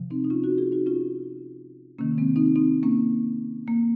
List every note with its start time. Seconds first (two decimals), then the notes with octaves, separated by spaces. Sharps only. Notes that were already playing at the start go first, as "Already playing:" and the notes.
Already playing: C3 F3
0.10 C4 D#4
0.24 D#4
0.30 C#4 F4
0.43 D#4 F#4
0.58 F4 G#4
0.72 D#4 F#4
0.86 C#4 F4
1.99 C3 D#3 A#3 C#4
2.18 G#3 C4
2.36 C4 D#4
2.56 C4 D#4
2.83 A#3 C#4
3.67 A#3